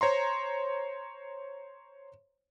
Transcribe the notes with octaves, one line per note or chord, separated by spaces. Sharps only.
C5 C#5 A#5 C6